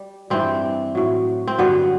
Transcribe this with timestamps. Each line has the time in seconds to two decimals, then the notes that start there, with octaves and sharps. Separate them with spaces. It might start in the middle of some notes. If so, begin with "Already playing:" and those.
Already playing: G3
0.30 G2 E3 G3 C4
0.95 A2 F#3
1.47 C4
1.58 G2 D3 F#3 B3